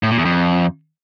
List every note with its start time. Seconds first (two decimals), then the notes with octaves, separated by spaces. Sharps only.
0.03 A2
0.10 A#2
0.18 E2
0.25 F2